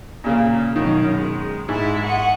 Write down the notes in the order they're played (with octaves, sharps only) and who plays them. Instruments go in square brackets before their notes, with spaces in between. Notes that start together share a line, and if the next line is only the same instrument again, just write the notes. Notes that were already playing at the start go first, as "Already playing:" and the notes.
[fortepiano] A#2 C#3 A#3
[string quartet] F#2 B2 C#4 [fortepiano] D#3
[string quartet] G#3
[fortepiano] G#2 [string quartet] G#3 E4
[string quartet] D#5 F#5 C#6